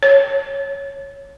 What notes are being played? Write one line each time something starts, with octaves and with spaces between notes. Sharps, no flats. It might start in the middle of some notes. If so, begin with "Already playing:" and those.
C#5